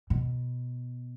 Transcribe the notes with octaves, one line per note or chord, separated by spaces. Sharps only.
B2